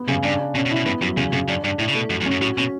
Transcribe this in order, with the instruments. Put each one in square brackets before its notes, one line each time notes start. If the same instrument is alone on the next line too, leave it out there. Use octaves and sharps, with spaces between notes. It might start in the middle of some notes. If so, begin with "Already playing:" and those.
Already playing: [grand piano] B3
[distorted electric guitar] F#2 [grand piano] C#3
[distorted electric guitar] G2 [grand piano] D4
[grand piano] D4
[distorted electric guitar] B2 [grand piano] C#4
[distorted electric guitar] B2
[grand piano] E4
[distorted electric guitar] B2
[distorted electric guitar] G2 [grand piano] B3
[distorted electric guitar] F#2 [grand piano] F#3
[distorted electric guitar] E2 [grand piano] C#3
[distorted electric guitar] F#2 [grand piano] C#3
[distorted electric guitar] F#2 [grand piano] D4
[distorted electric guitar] G2 [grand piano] D4
[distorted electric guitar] A2 [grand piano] E4
[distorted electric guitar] C#3
[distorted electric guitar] B2 [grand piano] A3
[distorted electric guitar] F#2 [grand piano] F#3
[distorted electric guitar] E2
[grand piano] C#4
[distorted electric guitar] F#2
[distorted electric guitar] A2 [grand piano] F#4
[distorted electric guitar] B2 [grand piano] C#4